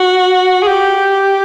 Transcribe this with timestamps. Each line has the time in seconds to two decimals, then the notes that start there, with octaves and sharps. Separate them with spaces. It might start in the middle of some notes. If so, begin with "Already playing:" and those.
Already playing: F#4
0.63 G#4
0.67 G4